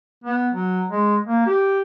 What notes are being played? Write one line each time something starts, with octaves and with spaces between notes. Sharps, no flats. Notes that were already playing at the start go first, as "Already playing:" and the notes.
B3
F#3
G#3
A#3
G4